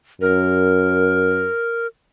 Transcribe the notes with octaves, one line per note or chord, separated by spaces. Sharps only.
F#2 A#4